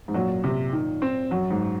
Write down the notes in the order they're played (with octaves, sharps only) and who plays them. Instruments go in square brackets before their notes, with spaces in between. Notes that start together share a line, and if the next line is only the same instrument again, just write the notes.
[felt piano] G#2
[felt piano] F#2 A#2 [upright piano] F#3
[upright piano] C3
D#3
C4
[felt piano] F#2 [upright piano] F#3
[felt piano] G#2